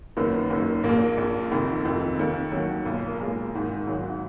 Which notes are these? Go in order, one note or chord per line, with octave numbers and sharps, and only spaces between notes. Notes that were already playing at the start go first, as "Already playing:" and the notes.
F#1 F#2 D#3 B3
F#1 F#2 D#3
A#1 A#3
A#2
A#1 A#2
F1 F2 D#3
F1 F2 D#3
D#2 D#3
D#2 D#3 F#3
B1 A#2
A#3
B1 A#2 G#3
G#1 G#2 D#3
G#1 G#2 D#3 F#3